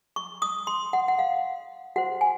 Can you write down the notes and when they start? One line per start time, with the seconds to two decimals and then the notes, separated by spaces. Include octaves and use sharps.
0.16 C#6
0.42 D#6
0.67 C6
0.93 F#5
1.08 F#5
1.19 F5
1.96 F#4 C5 F#5
2.21 G#5